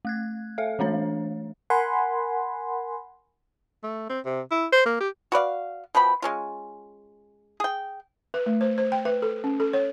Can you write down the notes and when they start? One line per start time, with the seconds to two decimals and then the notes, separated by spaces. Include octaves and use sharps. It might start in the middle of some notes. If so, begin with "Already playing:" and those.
0.05 A3 F#6 G#6
0.58 A4 E5 F5
0.79 E3 A3 D4 C#5
1.70 A#4 F#5 G#5 B5 C6
3.83 A3
4.09 C4
4.25 C3
4.51 E4
4.72 C5
4.86 A#3
5.01 G4
5.32 F#4 B4 D5 F5
5.95 B2 F3 G5 B5
6.22 G#3 C#4 F4
7.60 G#4 G5
8.34 B4
8.46 A3
8.61 C5
8.78 C5
8.92 G5
9.05 B4
9.22 A4
9.44 C#4
9.60 A4
9.73 C#5